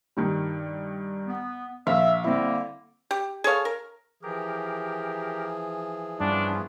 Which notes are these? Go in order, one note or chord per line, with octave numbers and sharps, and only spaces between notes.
G2 D#3 G3
B3
A#1 E5 F5
D3 G3 A#3 C4 E4
G4
G#4 A4 C#5 F5
A#4
E3 F3 G4 G#4 A#4
G2 B3 C#4 D4 F4